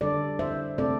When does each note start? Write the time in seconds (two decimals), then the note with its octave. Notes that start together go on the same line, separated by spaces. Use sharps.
0.01 D3 G3 D4 A4 D5
0.39 C5 E5
0.78 C3 A3 C4 A4 D5